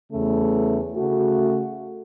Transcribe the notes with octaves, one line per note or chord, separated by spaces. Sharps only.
E2 C#3 A3
C#3 A3 F#4